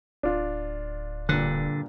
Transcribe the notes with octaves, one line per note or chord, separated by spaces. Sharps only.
D1 D4 F4
G2 A#2 D3 F#6